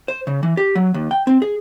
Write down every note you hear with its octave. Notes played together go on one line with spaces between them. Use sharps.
C5
C#3
E3
G4
F#3
D#2
G5
C4
G#4